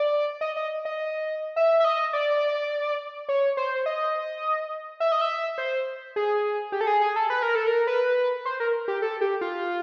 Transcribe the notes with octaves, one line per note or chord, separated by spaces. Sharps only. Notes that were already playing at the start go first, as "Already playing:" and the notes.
Already playing: D5
D#5
D#5
D#5
E5
E5
D#5
D5
C#5
C5
D#5
E5
D#5
E5
C5
G#4
G4
A4
G#4
G#4
A4
B4
A#4
A4
A#4
B4
C5
A#4
G4
A4
G4
F4